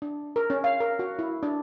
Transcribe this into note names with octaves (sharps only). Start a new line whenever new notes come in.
D4
A#4
C#4
F5
A#4
F#4
E4
D4